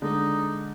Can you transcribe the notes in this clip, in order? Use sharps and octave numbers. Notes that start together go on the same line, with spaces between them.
D3 G#3 D4 D#4